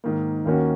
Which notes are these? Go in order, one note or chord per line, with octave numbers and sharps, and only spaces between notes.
G#2 D#3 A#3
D#2 D#3 A#3 C#4 F#4